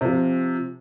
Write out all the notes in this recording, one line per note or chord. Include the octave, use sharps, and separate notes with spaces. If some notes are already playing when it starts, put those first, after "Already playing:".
C3 F3